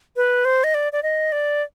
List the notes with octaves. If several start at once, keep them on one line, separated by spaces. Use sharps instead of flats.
B4
C5
D#5
D5
D5
D#5
D5